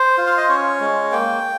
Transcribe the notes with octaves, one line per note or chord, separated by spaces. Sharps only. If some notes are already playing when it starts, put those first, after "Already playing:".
Already playing: C5
F4
F5
D#5
C#4 C#5
G#3
A#3 G5